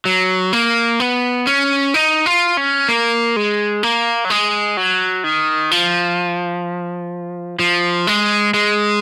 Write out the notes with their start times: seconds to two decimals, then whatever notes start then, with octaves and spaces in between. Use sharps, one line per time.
0.05 F#3
0.53 A#3
1.00 B3
1.47 C#4
1.94 D#4
2.26 F4
2.57 C#4
2.89 A#3
3.36 G#3
3.83 A#3
4.25 F#3
4.30 G#3
4.77 F#3
5.24 D#3
5.71 F3
7.59 F3
8.07 G#3
8.54 G#3